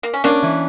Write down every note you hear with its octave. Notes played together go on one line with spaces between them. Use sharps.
A#3
C#4
A#3 C#4 D4
E3